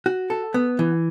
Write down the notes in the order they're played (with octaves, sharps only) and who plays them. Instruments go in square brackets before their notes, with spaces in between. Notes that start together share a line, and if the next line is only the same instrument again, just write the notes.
[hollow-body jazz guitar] F#4
A4
B3
E3